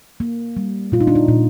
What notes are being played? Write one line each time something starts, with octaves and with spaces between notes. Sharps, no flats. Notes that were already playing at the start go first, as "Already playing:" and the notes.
A#3
G3
A#2 F4
D#4
D4
D#4
A#2